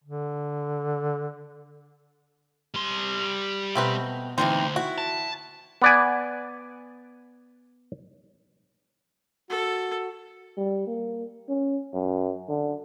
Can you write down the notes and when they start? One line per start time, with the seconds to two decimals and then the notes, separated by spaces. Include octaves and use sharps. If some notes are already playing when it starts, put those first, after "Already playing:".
0.04 D3
2.74 G3 C6
3.75 B2 A3 C4 B4 A#5
4.38 D2 E3 C4 D#4 C5
4.76 E4 F#4
4.98 A5
5.82 B3 D5 G#5
9.50 F#4 A4
10.58 G3
10.87 A#3
11.49 C#4
11.94 F#2
12.49 D3